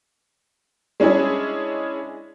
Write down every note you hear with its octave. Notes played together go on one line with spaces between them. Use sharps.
G#3 C#4 D4 E4 G#4